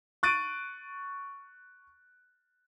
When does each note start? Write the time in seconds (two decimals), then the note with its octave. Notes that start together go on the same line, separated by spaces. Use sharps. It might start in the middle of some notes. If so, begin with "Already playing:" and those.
0.23 C#6 F#6 A6 D7 D#7